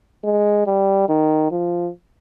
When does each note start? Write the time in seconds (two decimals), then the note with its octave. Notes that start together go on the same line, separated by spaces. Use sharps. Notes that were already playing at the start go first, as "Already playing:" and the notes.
0.24 G#3
0.66 G3
1.09 D#3
1.51 F3